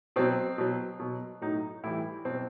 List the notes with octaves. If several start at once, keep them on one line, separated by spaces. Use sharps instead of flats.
B2 F#3 C4
B2 F#3
B2 F#3
A2 F#3 D#4
A2 E3 G3 E4
B2 F#3 C4